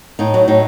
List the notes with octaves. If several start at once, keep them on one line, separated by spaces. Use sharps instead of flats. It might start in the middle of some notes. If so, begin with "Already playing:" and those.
A2 D#4
F#3
A2 D#4